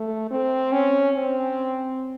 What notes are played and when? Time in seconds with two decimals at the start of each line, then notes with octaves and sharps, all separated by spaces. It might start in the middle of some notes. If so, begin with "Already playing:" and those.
Already playing: A3
0.31 C4
0.72 C#4
1.15 C4